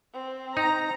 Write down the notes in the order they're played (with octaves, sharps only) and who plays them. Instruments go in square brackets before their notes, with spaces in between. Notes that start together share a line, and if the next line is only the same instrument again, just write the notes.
[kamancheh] C4
[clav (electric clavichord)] D#4 [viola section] A#5